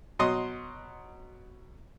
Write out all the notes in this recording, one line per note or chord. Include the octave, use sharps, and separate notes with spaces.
B2 F#3 D#5 C6 D#6